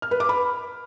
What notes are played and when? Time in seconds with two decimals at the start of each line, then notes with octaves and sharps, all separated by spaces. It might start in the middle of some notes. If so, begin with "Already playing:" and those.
0.02 F6
0.11 B4
0.20 D6
0.29 B5